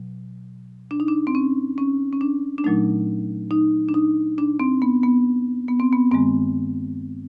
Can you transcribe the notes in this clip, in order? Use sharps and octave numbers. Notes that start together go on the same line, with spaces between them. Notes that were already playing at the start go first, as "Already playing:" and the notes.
Already playing: B2 F#3
D4
D#4
D4
C4
C#4
C#4
C#4
D4
D4
A#2 F#3 A3 D#4
D#4
D4
D#4
D4
C4
B3
B3
B3
C4
B3
G2 D#3 G#3 C4